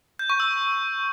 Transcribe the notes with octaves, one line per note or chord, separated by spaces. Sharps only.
G6
C#6
E6